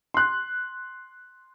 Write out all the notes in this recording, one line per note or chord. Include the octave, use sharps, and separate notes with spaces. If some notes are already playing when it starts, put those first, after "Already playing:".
C6 F#6